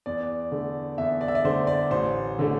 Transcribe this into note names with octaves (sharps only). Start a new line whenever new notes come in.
E2 D5
D3 A3
E2 E5
D5
E5
D5
D3 A3 C5
D5
A1 C5
D3 A3